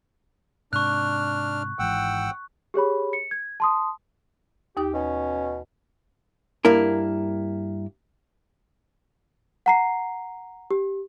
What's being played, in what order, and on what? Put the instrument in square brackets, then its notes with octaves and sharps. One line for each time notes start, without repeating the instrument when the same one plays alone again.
[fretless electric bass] G#2 C3 [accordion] D4 F6 [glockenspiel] C#6 F#6
[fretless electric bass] G#1 G#2 E3 [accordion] F#5 G5 E6
[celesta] G4 G#4 C#5 B5
C#7
G#6
A5 C6 D#6
[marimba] D#2 D#4 D#6 [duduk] G4
[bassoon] B2 [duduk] C#4
[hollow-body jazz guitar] G2 A#3 E4 A#4
[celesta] F#5 A#5 C7
G4